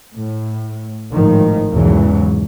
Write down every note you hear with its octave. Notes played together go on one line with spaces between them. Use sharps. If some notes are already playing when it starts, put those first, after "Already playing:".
A2
G#1 A2 D#3 F3
B1 E2 G#2 C#3 E3 F#3